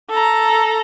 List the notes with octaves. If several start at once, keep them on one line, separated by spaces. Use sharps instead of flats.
A4 A#5